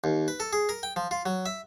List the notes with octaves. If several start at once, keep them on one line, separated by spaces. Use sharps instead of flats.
D#2
B4
A4
G#4
A#4
G5
F3
F4
F#3
E5